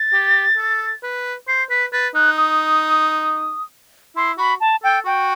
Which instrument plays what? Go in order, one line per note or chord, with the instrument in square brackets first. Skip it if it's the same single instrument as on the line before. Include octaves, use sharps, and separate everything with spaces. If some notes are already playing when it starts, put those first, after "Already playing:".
Already playing: [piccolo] A6
[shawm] G4
A4
B4
[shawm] C5 [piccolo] C7
[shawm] B4 [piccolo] B6
[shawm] B4 [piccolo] A6
[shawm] D#4 [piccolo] F#6
[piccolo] D#6
[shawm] E4 [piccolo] C6
[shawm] F#4 [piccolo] B5
[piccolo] A5
[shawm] A4 [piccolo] G5
[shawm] F#4 [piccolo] G5